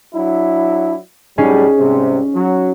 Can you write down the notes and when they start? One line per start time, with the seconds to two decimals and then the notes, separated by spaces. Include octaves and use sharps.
0.14 F#3 D4 E4
1.38 A2 F#3 G3 C#4 D#4 G#4
1.79 C2 G#2 C3
2.35 F#3